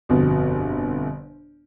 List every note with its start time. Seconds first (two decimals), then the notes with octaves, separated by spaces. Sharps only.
0.09 G1 F2 B2